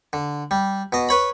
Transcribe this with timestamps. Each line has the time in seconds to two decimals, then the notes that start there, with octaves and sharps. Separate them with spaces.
0.13 D3
0.51 G3
0.93 B2 D#5
1.09 B4 C#5 B5